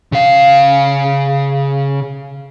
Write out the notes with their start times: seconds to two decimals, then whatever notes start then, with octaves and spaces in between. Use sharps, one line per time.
0.12 C#3 F5